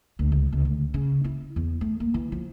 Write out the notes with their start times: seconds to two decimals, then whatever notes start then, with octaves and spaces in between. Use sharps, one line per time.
0.19 D2
0.32 C#2
0.52 C#2
0.65 D2
0.94 C#3
1.24 E4
1.56 E2
1.81 A3
2.00 A#3
2.14 E3
2.32 F3